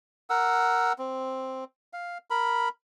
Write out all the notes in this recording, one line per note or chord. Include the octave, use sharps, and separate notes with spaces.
A#4 F#5 E6
C4
F5
A#4 B5